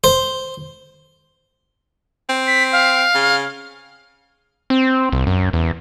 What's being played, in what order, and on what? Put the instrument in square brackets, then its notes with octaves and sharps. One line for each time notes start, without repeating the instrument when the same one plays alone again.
[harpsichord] C5
[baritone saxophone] C4
[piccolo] B6
F5
[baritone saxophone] C#3
[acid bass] C4
C2
F#2
E2